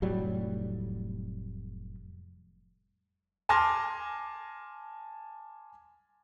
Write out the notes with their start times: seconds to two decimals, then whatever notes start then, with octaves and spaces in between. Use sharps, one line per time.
0.02 F1 A2 F#3 G3
3.49 G#5 A5 C6 D6 F6 A#6